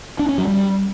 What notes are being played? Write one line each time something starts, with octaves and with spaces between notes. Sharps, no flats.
D4
C#4
F#3
G3